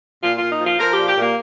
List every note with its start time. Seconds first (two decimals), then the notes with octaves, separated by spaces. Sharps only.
0.22 A#2 F4
0.36 F4
0.41 A#2
0.50 D#4
0.60 F3
0.65 F4
0.78 F3 A#4
0.93 A#2 G4
1.08 G4
1.16 A#2
1.22 A#3